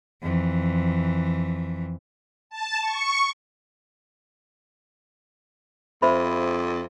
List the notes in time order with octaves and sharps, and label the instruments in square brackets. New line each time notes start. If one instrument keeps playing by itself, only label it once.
[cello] F2 E3
[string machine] A5
C#6
[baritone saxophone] F2 [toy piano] C5 E5 B5